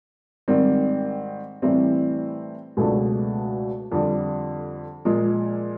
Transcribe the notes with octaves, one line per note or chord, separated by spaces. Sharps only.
G#2 D#3 G3 C4
A2 E3 G3 C4
C#2 B2 F#3 A3 D4
F2 D3 G3
A#2 F3 G#3